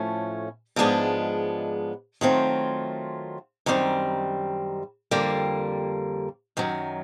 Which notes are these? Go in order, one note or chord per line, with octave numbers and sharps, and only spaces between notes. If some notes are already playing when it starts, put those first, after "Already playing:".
Already playing: A2 F3 A3 C#4
G#2 F3 G#3 B3 D4
D#3 F#3 A3 C4 F4
F#2 D#3 G3 C4
F2 D3 G3 A#3
F#2 D#3 F#3